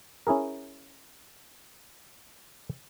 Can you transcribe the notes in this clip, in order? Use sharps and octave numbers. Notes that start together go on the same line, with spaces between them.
C#4 E4 G#4 A#4